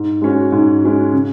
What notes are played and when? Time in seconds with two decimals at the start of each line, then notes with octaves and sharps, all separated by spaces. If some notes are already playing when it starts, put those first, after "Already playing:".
Already playing: G#2
0.22 G#3 C#4 F#4
0.52 G#2
0.83 G#3 C#4 F#4
1.13 C#3